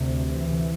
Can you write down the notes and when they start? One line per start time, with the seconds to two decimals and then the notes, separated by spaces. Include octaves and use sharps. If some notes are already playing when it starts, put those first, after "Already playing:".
Already playing: D2 C3
0.27 E3